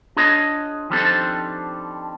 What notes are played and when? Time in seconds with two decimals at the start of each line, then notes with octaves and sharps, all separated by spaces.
0.17 D4 F4 G#4 C#5 D#5
0.90 D#3 F3 G3 C4 D4 A4